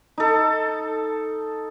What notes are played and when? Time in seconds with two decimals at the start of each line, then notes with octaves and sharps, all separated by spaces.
0.18 D#4 A4